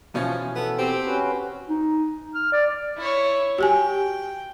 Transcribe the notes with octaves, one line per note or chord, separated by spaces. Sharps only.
B2 E3 F3 C#4
B3 A4
C4 G4
C#4 F#4 B4
D#4
F6
D5
E4 C#5
F#4 G4 G5 G#5